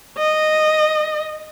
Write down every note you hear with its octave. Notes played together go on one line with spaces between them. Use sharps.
D#5